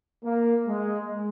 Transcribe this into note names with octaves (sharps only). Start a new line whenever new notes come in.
A#3
G#3